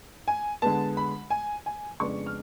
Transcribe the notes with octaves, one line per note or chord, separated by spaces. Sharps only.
G#5
D3 G#3 B3 A5
B5
G#5
G#5
F2 C#3 G#3 B3 D4 C#6
F6